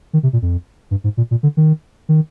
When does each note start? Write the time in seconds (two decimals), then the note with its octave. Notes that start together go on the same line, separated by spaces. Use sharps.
0.13 D#3
0.23 C3
0.33 A#2
0.42 F2
0.91 G2
1.04 G#2
1.17 A#2
1.31 A#2
1.43 D3
1.57 D#3
2.09 D#3